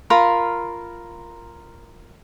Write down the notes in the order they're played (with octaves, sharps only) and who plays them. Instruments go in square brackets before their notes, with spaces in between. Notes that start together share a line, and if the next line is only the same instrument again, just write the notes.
[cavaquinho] F4 A#4 B5